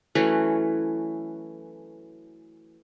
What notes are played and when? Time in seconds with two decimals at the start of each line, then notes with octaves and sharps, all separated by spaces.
0.15 E3 F#3 A3 C#4